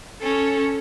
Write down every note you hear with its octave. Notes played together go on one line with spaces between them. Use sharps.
C#4 A4